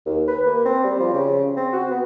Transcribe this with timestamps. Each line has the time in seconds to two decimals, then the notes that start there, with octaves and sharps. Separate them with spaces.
0.06 D#2
0.28 B4
0.46 A#3
0.65 C4
0.84 G3
1.00 F3
1.13 C#3
1.57 C4
1.73 F#4
1.90 B3